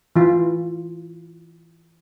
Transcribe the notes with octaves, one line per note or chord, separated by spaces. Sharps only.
E3 F4